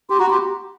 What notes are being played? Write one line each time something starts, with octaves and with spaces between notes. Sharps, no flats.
G4 C6
F#4 A#5
G4 C6